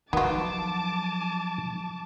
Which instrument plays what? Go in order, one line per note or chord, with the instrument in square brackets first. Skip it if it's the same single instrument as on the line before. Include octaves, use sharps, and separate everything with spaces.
[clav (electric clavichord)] D#3 F#4 [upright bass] F3 F#3 [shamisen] B3 F4 [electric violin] A5 D6